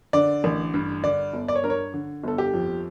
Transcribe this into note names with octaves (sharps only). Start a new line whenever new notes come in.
D3 D5
A1
G2
D3 D5
G1
D5
C#5
G2 A#4
C#5
D3
G1 A4
G4
F2